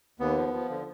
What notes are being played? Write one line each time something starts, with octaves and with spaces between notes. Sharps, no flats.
D#2 B3
F3
F3
D3